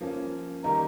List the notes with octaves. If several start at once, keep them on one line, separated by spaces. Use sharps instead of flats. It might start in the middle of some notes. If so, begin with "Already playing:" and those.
F3 A#3 C#4
D#3 G3 A#3 D#4 A#5